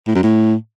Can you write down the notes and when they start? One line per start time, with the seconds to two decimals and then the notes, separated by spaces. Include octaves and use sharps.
0.07 A2
0.15 F#2
0.23 A2